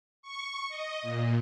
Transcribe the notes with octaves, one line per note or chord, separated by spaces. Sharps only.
C#6
D#5
A#2